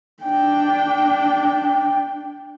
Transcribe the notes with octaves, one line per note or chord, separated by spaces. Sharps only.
D4 G5